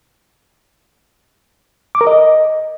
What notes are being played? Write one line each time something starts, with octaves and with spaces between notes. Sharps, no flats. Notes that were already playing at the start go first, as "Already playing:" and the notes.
D6
A#4
D#5